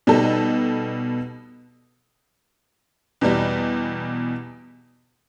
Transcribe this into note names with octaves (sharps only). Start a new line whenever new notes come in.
B2 G3 D#4 A4
E2 B2 G3